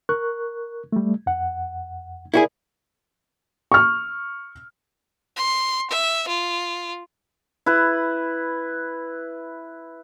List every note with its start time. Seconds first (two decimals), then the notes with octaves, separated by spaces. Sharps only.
0.09 A#4 C#6 F#6
0.92 G3 A3
1.26 F2 F#5
2.34 E4 F#4 G#4 A#4 D5
3.72 C#6 F6
5.36 C6
5.90 E5
6.28 F4
7.66 E4 B4